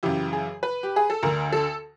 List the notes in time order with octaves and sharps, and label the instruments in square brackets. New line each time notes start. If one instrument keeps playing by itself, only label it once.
[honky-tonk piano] F#2 C#3 E3 G4
G#4
B4
G4
G#4
A4
D2 D3 A#4
A4